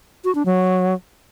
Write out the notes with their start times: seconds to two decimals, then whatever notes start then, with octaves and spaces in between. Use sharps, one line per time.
0.24 F#4
0.35 D4
0.46 F#3